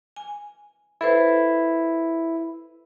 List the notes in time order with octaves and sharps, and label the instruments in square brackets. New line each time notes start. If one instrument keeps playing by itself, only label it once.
[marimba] G#5
[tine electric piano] E4 [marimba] A4 B4 C5